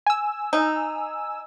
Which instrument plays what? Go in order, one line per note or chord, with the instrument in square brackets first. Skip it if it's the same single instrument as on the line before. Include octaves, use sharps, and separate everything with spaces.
[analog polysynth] G#5 E6
[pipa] D#4